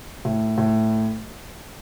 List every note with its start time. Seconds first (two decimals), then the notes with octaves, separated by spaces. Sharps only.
0.25 A2
0.58 A2